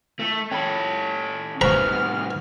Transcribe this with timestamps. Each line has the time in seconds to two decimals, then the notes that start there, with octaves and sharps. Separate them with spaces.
0.20 A3
0.51 C#4 A4 G5 B5
1.61 A2 G3 B3 C5 G#5 A#5 C#6 F6